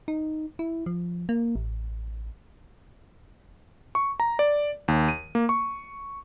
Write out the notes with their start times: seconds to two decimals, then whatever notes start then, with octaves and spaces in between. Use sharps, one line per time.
0.08 D#4
0.59 E4
0.86 F3
1.29 A#3
1.56 A1
3.95 C#6
4.20 A#5
4.39 D5
4.88 D#2
5.09 D#7
5.35 A#3
5.49 C#6